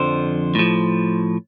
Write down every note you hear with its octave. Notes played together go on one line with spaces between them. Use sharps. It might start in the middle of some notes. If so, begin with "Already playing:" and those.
Already playing: F2 D3 F3 C5
A2 F3